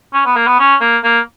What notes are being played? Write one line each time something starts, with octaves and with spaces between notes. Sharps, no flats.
C#4
B3
A#3
B3
C#4
A#3
A#3